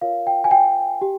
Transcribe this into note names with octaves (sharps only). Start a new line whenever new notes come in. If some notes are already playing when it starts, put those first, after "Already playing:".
F4 A#4 C#5 F5
G5
G#5
G5
G4